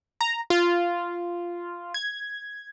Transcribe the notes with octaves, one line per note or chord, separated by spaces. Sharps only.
A#5
F4
G#6